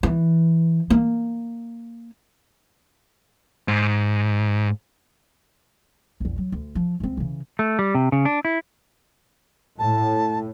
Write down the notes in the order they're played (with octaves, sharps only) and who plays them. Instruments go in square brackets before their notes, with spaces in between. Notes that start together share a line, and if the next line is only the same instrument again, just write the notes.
[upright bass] E3
A#3
[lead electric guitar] G#2
[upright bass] A#1 E2
F#3
D2
F3
C#2 C4
C#3 E3
[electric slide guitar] A3
G3
C3
C#3
D4
E4
[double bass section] A2 [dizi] A5